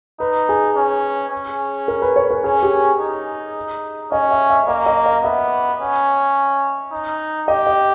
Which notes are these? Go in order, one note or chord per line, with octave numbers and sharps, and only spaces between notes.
D#4 B4
G#4
C#4
C#4
A#4
B4
C#5
A#4
C#4 G#4
G4
D#4
C#4 D#5
E5
E5
A#3 D#5
D#5
D#5
B3 E5
C#4
D#4
G4 D#5
D#5